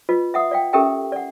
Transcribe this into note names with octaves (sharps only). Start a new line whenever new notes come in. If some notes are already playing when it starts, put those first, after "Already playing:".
F4 B4 D#5
E5 F#5 D#6
D5 F5 G5
C#4 G4 A4 A#4 E5 G5
D5 F#5